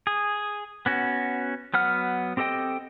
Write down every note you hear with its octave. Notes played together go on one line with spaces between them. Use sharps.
G#4
B3 C#4 F#4
F#3 B3 F#5 F6
C4 G4 A4 D#5 G5